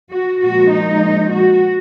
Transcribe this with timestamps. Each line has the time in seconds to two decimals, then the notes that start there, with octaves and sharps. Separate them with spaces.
0.11 F#4
0.41 A#2 F3 G#3 F#4
0.71 D#4
1.31 F#4